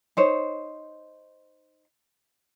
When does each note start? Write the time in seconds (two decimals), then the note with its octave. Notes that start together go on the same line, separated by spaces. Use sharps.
0.17 D#4 C5 C#5